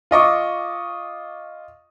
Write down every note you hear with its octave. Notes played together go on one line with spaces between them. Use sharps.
F4 D#5 C#6 D6